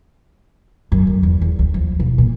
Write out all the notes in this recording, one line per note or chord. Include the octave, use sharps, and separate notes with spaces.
F#2
D2
E2
E2
D2
F3
E1
A#2